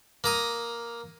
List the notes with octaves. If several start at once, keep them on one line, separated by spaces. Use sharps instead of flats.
A#3 A#5 D#6